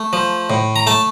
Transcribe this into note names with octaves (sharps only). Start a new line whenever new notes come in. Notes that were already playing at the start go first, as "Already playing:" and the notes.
Already playing: A3
F3
A2
A#5
A3 A5